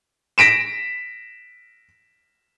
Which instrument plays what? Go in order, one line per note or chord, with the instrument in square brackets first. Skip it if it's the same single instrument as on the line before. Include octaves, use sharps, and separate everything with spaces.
[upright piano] A#6 B6 D7 E7